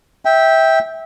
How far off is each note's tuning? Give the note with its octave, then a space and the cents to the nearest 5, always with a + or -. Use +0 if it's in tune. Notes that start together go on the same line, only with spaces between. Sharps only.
E5 -20 G5 +0